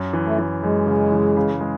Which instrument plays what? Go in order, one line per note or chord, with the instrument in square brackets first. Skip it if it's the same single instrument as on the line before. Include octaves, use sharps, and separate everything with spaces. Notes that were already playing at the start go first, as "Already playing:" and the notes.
Already playing: [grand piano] F#2
E3
[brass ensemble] A3
[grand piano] E3
[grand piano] F#2 [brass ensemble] G#3
[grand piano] C#3
E3
C#3
G#3